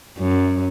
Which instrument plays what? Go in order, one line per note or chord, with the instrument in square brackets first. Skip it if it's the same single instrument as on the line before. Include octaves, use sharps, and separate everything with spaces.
[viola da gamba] F#2